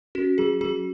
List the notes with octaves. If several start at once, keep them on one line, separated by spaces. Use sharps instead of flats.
C#4 F#4
F#3 G#4
F#3 G#4